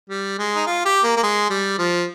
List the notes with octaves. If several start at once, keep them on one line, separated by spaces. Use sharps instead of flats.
G3
G#3
D#4
F4
G4
A#3
A#3
G#3
G3
F3